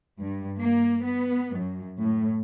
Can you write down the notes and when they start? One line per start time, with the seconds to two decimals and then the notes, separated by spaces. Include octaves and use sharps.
0.20 G2
0.59 A#3
1.05 B3
1.55 F#2
2.01 A2